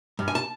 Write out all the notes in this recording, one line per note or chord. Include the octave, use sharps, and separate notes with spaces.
G2
G#5
A5